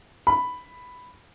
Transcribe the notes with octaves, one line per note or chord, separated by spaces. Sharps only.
B5